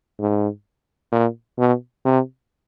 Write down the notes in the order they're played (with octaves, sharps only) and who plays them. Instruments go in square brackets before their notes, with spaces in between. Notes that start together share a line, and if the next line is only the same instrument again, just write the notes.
[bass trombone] G#2
A#2
B2
C3